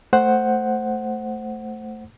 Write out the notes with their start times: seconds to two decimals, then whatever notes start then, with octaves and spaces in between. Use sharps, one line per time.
0.13 A3 C5 F#5